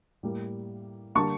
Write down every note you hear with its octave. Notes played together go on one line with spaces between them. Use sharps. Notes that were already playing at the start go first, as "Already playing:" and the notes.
A2 G3 A#3
D3 G3 A#3 A5 C#6